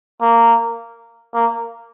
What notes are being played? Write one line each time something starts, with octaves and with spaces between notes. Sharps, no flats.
A#3
A#3